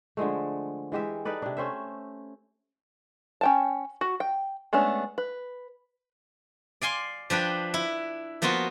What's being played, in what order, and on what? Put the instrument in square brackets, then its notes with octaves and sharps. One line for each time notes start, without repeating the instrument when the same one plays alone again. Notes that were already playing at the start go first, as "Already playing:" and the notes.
[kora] D3 F3 G#3 A3
E3 G#3 G4 E5
D#4 A4 B4 D5
C3 D4
A3 C#4 C5 E5
[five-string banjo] C#4 G5 A5
F#4
G5
G#3 A3 B3 C#4 D4
B4
[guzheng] D5 F5 G#5 C6
F3 D4 B4 G5
E4
F3 A#3 B3 F4 F#4